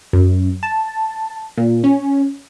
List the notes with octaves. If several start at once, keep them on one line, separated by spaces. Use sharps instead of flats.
F#2
A5
A#2
C#4